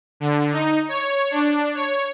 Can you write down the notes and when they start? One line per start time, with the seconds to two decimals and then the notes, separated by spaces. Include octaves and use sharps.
0.20 D3
0.52 D#4
0.89 C#5
1.31 D4
1.75 C#5